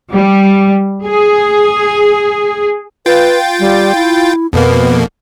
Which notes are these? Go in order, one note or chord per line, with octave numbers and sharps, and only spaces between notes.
G3
G#4
F4 B4 G5 A6
G3
E4
F2 B2 A#3 B3